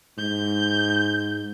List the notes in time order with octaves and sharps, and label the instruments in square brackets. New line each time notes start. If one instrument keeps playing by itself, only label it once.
[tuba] G#2 [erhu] G6